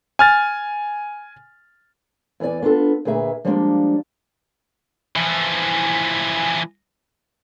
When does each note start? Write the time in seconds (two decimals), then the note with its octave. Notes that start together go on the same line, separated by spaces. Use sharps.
0.19 G#5 F6 A6
2.40 E2 E3 D4 D5 G#5
2.62 B3 D4 F4 A4
3.05 D2 A#2 G#4 B4 E5
3.45 F3 G3 G#3 A#3 C4 D4
5.16 E3 F3